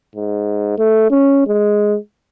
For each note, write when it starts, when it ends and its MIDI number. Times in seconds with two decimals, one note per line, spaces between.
0.16 0.74 44
0.78 1.10 57
1.10 1.42 61
1.47 1.97 56